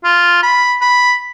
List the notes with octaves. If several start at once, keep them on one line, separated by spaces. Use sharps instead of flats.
F4
B5
B5